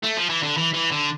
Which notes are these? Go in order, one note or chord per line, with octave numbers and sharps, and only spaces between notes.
A3
F3
E3
D3
E3
E3
D3